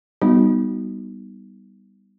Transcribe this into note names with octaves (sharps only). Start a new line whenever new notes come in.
G3 B3 D#4 F#4